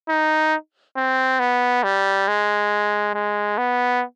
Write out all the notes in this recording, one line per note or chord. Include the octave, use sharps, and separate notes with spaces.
D#4
C4
B3
G3
G#3
G#3
B3